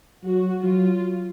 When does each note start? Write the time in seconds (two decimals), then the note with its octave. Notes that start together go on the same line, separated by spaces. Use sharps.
0.24 F#3 F#4
0.63 F#3 F4